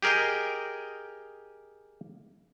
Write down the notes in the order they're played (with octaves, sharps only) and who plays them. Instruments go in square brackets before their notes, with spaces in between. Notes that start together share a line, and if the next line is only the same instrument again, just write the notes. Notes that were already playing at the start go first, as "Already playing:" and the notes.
[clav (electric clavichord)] G4 G#4 A#4 D#5 G5